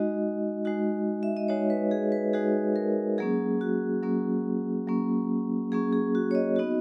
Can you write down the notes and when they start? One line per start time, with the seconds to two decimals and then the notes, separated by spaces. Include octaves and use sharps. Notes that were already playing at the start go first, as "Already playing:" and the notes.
Already playing: G#3 D#4 F#4 D#5
0.65 G#3 D#4 F#4
1.23 E5
1.37 D#5
1.48 G#3 D#4 F#4 C#5
1.70 B4
1.91 G#4
2.12 B4
2.33 G#3 D#4 F#4 G#4
2.76 A#4
3.18 F#3 A#3 C#4 G#4
3.61 F#4
4.03 F#3 A#3 C#4
4.87 F#3 A#3 C#4
5.72 F#3 A#3 C#4 G#4
5.93 G#4
6.15 F#4
6.31 C#5
6.35 D#5
6.56 B3 D#4 F#4